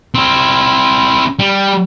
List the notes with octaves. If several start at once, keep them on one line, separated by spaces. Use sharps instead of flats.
C4 E4
G3